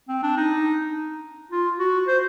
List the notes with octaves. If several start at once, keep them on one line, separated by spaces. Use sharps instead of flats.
C4
D4
D#4
F4
F#4
C5